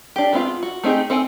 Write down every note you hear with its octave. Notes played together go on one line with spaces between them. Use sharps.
D4 G4
G#3 B3 C4 E4 F4
F#4
A3 C4 D#4 G4 G#4
C4 A4 G5 G#5